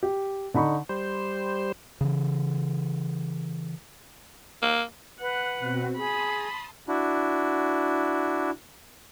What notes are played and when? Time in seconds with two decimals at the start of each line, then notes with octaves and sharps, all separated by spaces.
0.03 G4
0.54 D3 D#4 B5 C#6
0.89 G3 C5
2.01 C#3 E3
4.62 A#3
5.20 B4 F#5
5.59 B2 C4 F#4
5.97 G#4 A5 B5 C6 D#6
6.88 D4 E4 F#4